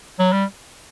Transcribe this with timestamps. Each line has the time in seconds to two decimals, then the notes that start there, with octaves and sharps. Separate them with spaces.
0.19 F#3
0.33 G3